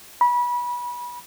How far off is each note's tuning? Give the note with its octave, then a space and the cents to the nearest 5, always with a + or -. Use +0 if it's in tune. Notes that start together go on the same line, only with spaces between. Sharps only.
B5 -25